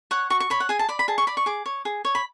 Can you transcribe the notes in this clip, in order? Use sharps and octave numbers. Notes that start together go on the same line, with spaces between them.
C#5 F#5
F#4 C#6
C#6
C#5 B5
F#5
G#4 G#5
A5
D5 B5
B5
G#4 A5
C#6
D5 B5
C#6
G#4 D6
C#5
G#4
C#5
B5